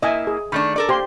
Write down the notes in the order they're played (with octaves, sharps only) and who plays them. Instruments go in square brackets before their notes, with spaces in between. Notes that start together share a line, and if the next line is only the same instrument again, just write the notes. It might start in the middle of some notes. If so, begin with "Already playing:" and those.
[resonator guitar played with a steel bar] A#3 E4 [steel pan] D#5 E5 G#5
[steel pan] G#4
[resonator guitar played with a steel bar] D#3 A3 D4 [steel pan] B5
[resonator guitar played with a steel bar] A4 A#4 D5
[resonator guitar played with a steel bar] A#3 [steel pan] G4 C5 C6